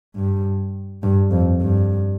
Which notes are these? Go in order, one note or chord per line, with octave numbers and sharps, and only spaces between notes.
G2
G2
F2
G2